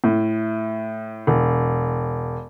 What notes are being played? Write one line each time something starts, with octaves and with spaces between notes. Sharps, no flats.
A2
E1